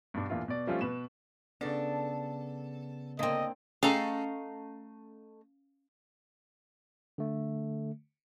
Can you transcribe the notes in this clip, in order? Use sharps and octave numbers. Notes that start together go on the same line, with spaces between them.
G2 B2 D4
E2 A#2 D4 E4 F4
B2 D5
F3 G3 A3 C4 C#4 F4
B2 B4 E7
C#3 B3 D4 A4
D3 A#3 C4 D#5
A3 C#4 G#4 A4 D#5 F5 A#5
D3 A3